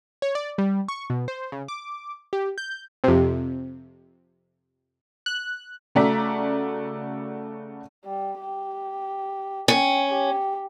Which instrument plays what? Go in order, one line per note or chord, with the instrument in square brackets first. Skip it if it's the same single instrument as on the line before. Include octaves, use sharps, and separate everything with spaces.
[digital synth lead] C#5
D5
G3
C#6
B2
C5
C#3
D6
G4
G6
[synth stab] F2 C3
F#6
[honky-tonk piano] C#3 A3 F#4 D5 A#5 B6
[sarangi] G3
G4
[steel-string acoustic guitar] C#4 [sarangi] G5
[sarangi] G4